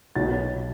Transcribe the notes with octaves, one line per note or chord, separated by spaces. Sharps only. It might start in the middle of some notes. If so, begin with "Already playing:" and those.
B1 A6